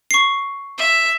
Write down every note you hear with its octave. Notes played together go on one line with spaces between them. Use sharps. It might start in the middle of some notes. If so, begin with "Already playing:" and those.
C#6 C7
E5